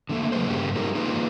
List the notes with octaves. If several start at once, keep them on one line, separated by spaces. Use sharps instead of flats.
D3 G3 A3 A#3
C#3 F#3 C#4 G#4 B4 C5
G2 C#3 A#3 G4
F3 G3 D#4 G4 A4 A#4
A#3 D#4 F4 G#4 B4